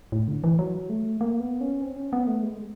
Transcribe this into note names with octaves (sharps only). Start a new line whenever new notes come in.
A2
D3
E3
F#3
A3
A#3
B3
C#4
C4
C#4
B3
A3
G#3